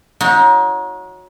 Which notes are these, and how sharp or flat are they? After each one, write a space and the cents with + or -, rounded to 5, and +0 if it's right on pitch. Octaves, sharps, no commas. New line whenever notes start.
D#4 +25 F#4 -25 C#5 +0